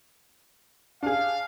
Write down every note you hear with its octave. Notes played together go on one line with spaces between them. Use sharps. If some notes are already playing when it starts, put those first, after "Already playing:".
D4 G#4 F5